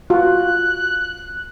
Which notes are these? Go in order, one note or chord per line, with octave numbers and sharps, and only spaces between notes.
F4 F#4 F#6